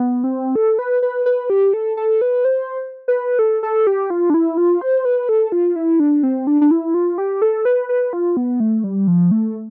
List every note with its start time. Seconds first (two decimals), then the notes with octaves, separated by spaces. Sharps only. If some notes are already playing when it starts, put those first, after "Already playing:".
Already playing: B3
0.24 C4
0.55 A4
0.79 B4
1.02 B4
1.26 B4
1.50 G4
1.74 A4
1.97 A4
2.21 B4
2.45 C5
3.08 B4
3.39 A4
3.63 A4
3.87 G4
4.10 F4
4.30 D4
4.34 E4
4.57 F4
4.81 C5
5.05 B4
5.29 A4
5.52 F4
5.76 E4
6.00 D4
6.23 C4
6.47 D4
6.61 D4
6.71 E4
6.94 F4
7.18 G4
7.42 A4
7.65 B4
7.89 B4
8.13 F4
8.37 B3
8.60 A3
8.84 G3
9.08 F3
9.31 A3